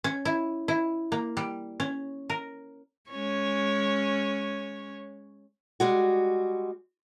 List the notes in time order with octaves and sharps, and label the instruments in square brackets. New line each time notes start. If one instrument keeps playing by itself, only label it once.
[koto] C#4
E4
E4
A#3
G3
C#4
A#4
[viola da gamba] G#3 C#4 C#5
[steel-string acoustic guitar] G3 G#3 F#4